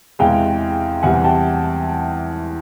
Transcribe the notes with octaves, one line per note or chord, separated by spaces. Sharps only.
E2 C3 E3 G#3 F5 G5
E2 C3 E3 G3 F#5 G#5
G5 A5